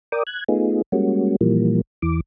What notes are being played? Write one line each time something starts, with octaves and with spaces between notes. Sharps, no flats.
A#4 D5 G5 D6 D#6
F#6 G#6
A3 B3 D#4 F4 G#4
G3 G#3 A#3 C#4 F#4
A#2 E3 F3 G3 A#3
E2 E3 D6